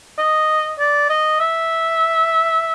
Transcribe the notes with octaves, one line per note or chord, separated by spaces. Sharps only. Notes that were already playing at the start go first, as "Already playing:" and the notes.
D#5
D5
D#5
E5